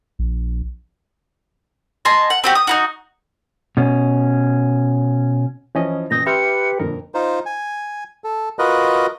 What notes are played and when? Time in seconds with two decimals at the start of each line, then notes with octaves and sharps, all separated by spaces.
0.19 A#1
2.05 D#5 G#5 A5 C6
2.30 F#5
2.44 C4 F#4 G4
2.55 D#6
2.67 D#4 E4 F#4
3.77 B2 C#4
5.75 E3 F3 C#4 E4 D#5
6.11 A1 A#2 D#6 G6 A#6
6.26 G4 B4 E5 C6 F6 G6 C#7
6.80 F2 A#2 D3 A#4
7.14 D#4 F4 C5
7.46 G#5
8.24 A4
8.59 F4 F#4 A#4 B4 D#5 F#6